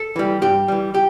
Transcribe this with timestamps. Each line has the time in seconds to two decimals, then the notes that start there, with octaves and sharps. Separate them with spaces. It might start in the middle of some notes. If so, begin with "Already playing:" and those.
Already playing: A4
0.16 E3 G3
0.42 G2 G4
0.68 E3 G3
0.94 G4